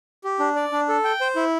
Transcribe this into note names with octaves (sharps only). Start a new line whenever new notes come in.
G4
D4
D5
D4
A4
G5
C5
E4